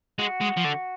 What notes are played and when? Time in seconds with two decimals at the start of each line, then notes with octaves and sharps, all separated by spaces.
0.19 G#3 F#4
0.41 G#3
0.57 F3
0.65 D3